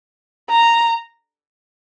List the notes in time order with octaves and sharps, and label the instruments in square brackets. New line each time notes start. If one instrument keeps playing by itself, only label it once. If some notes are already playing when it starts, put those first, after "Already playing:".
[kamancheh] A#5